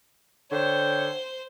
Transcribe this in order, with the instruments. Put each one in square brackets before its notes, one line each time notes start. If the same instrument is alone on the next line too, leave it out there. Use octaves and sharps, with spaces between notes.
[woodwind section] D3 C#5 G5 [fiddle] C5